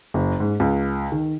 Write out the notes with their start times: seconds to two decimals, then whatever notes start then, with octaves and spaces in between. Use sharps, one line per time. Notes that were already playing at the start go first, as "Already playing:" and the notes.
0.14 F#1
0.40 G#2
0.60 C#2
1.12 D#3